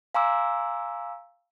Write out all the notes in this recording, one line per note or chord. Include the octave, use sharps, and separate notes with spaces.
F5 G#5 A#5 C6 D6 E6